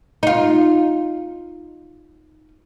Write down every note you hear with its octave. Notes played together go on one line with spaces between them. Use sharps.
D#4 F4